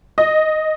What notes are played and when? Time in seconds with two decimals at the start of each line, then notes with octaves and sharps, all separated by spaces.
0.18 D#5